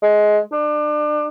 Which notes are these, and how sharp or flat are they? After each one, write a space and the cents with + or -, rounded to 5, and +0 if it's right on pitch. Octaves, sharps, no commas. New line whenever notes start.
G#3 +15
D4 +30